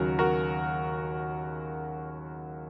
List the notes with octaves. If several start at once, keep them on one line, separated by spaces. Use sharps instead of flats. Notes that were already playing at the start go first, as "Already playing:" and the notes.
Already playing: D#2 C#3 F#3 F#4 A#4
F#4 A#4